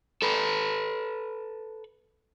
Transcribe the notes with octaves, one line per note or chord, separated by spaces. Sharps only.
A4 B4